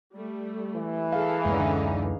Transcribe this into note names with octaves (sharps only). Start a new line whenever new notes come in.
G3 A3
E3
G#4 A4 F5
D1 F#2 D3 G#3 C#4 D#4 B4